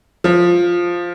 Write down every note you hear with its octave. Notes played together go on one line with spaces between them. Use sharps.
F3